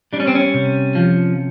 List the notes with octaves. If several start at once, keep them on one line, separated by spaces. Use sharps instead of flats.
G3 D4
C#4
C4
C#4
C3
F3